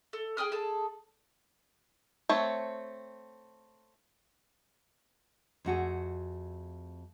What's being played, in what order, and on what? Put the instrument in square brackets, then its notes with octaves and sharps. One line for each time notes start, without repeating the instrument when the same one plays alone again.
[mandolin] A4
G#4 G5 D#6 F6
G#4 A4 A5
[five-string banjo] A3 C4 C#5
[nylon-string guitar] F2 A3 F#4 G#4